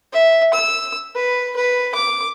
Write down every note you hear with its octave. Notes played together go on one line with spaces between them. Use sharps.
E5
E6
B4
B4
D6